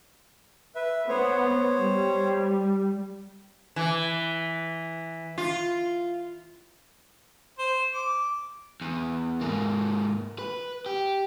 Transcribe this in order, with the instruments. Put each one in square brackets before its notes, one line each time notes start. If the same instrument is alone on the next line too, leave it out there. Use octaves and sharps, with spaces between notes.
[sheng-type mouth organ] B4 E5
[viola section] B3 [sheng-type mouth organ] C5 C#5
[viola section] G3
[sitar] E3
F4
[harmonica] C5
D6
[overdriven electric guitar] E2
G#2 A#3
B4
G4